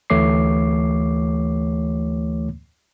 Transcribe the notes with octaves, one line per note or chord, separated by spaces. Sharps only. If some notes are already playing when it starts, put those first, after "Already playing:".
D2 E3 A3 C#5 D6 C7